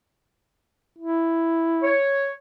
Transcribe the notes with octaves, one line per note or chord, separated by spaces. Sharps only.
E4
C#5